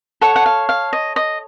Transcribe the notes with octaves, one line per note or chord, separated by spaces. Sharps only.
A4 C#5 F#5
F#5
F5
F5
D#5
D#5